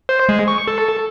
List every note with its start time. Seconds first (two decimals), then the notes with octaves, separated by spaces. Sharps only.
0.09 C5
0.29 G#3
0.48 C#6
0.68 A4